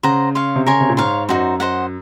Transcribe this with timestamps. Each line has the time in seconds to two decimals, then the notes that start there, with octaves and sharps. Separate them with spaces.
0.03 C#3 C5 F#5 A#5
0.35 C#5 F5 C6
0.56 C3
0.66 C#3 A#4 C#5 G#5 C6
0.80 C3
0.89 A#2
0.97 G#2 C#5 F5 C6
1.29 F#2 D#4 F#4 C5
1.60 C5 D#5 F#5